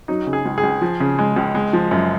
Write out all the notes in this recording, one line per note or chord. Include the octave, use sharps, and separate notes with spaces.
F#3 D#4
C#3
G#4
C#2
G#4
C#2
F3
C#3
G#3
C#2
G#3
F3
F#2